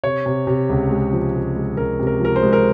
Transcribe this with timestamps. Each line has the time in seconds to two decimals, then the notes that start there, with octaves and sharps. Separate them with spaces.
0.03 C3 C#5
0.26 C3
0.47 C3
0.70 C#2
0.90 G#3
1.13 F3
1.34 C3
1.55 G#3
1.77 C#2 A#4
1.99 C3
2.07 A#4
2.20 F3 A#4
2.36 C5
2.42 G#3
2.53 A#4